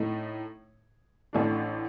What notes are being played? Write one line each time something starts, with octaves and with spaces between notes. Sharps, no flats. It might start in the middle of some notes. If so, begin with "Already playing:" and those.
Already playing: A2 A3 D#4
A1 A2 A3 D4